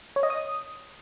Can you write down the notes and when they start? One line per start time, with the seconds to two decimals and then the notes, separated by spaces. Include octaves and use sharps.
0.16 C#5
0.23 D#5
0.30 D#6